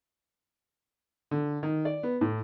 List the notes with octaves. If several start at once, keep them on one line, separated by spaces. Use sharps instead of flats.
D3
D#3
D5
B3
A2